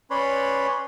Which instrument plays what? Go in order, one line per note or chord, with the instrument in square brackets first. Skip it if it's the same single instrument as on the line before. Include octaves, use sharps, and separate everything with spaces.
[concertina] C#4 B4 C#5 D5 B5 C6